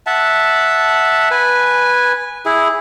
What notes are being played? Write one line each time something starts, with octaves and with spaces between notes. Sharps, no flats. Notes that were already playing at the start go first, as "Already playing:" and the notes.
E5 F#5 A5
B4 G#5
E4 G#4